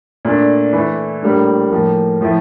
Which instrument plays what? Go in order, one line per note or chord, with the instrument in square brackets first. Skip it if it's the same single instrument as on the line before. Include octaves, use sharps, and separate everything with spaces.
[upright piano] A#2 A3 D4
E3 A3 E4
A2 G3 A#3 D4
A2 F3 A#3
A2 F3 A3 E4